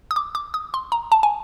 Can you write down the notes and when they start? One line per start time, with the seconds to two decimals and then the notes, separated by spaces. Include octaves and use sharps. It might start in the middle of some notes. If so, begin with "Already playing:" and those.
0.11 D#6
0.16 D6
0.35 D6
0.54 D#6
0.74 C6
0.92 A#5
1.12 A5
1.23 G#5